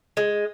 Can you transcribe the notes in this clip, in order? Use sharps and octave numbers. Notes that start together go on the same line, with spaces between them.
G#3